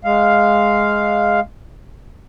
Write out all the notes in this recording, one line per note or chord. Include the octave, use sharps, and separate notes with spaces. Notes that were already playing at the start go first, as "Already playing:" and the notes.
G#3 F5